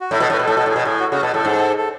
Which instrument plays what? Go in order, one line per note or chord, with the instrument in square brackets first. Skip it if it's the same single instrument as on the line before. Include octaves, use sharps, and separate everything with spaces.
[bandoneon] F#4
[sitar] A2 [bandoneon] E4
[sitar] B2 [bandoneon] A4
[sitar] A2 [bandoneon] B4
[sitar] B2
[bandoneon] A4
[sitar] A2
[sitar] B2 [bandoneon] A4
[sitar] A2
[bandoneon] G#4
[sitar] B2
[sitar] A2 [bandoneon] G#4
[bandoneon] F#4
[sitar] C#3 [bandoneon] F#4
[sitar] B2 [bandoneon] A4
[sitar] A2 [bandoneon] A4
[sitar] G#2
[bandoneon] A4